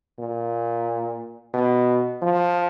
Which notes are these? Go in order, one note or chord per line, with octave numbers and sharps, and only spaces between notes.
A#2
B2
F3